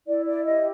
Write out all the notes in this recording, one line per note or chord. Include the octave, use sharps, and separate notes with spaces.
E4 D5
D5
G4 D#5